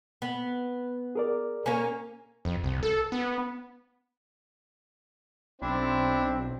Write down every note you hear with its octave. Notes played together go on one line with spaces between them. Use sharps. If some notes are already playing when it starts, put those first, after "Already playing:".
B3
G#4 A#4 D5
A#3 C#4 G#5
F2
C2
A4
B3
B1 C4 D4 E4